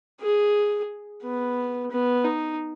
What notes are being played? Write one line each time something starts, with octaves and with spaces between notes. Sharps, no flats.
G#4
B3
B3
D#4